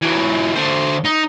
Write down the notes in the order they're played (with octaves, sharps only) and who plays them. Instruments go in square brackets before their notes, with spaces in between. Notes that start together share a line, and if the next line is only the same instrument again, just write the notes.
[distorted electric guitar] E3 F#3
D3 C5
D#4